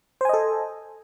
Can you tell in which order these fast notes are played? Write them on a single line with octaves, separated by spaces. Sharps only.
C5 G#5 D#5 A4